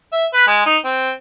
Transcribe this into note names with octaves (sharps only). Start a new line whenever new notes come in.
E5
B4
G#3
D#4
C4